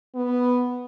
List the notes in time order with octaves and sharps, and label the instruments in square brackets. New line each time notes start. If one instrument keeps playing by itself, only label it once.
[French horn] B3